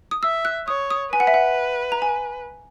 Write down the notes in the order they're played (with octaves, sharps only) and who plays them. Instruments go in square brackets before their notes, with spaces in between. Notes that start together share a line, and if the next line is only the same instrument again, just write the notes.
[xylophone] D#6
[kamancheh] E5 [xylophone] E6
[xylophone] F#6
[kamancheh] C#5 [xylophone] D#6
[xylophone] D#6
[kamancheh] B4 [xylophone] G#5
[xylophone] F#5
E5
F#5
A#5
G#5